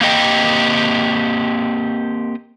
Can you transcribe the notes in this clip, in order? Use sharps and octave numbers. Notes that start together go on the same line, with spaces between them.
A#3 C4 G4 D#5 G5